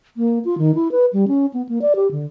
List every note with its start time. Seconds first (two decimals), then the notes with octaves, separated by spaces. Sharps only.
0.17 A#3
0.45 F4
0.58 D#3
0.75 E4
0.91 B4
1.13 G3
1.28 C#4
1.54 B3
1.69 A#3
1.82 D5
1.96 G4
2.11 D3